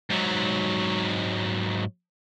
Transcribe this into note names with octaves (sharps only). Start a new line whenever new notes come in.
G#2 F#3